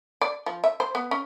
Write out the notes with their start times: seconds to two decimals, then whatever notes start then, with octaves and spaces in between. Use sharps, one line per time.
0.21 D5
0.46 F3
0.64 E5
0.80 C5
0.95 B3
1.11 C#4